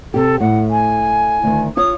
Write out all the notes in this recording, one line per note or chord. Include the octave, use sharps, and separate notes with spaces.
C3 G4 A4
A2 F#5
G#5
D2 D#3
F4 C#5 F5 D#6